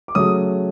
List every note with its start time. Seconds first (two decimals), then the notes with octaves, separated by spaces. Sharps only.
0.08 D6
0.15 C#3 F#3 A3 D#6